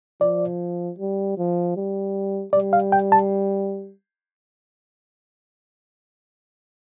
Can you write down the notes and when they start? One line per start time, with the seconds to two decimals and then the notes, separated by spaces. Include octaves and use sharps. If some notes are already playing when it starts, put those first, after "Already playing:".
0.21 F3 D5
0.99 G3
1.37 F3
1.76 G3
2.53 G3 D5
2.73 F5
2.92 G5
3.12 A5